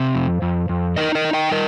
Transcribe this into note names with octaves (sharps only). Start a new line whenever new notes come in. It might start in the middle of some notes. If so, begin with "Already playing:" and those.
Already playing: C3 C5 F5
F2
F2
F2
D#4 A#4 D#5
A#4 D#5
D#4
D#5 G5
G3 A#4 D#5